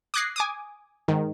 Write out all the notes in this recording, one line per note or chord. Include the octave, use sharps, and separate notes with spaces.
D6 D#6 F#6 G#6 A#6 C7
G#5 D6 D#6
G#2 D#3